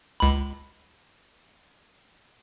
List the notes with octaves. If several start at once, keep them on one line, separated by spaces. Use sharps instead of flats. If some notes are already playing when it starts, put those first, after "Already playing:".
C#2 B5